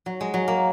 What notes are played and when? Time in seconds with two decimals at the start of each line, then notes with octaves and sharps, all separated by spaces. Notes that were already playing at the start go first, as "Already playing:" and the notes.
0.06 F#3
0.21 G#3
0.34 F#3
0.48 A#3